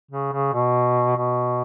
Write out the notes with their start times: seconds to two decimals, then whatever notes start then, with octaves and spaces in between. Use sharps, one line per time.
0.11 C#3
0.33 C#3
0.53 B2
1.17 B2